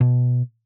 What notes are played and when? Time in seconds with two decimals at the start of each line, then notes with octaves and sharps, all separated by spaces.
0.01 B2